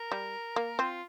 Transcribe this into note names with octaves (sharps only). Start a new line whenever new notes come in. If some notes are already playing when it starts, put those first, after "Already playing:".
Already playing: A#4
G3
A#3
C4 F4